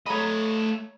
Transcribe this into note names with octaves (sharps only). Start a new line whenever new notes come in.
A3 C#5 D#5 A#5 B5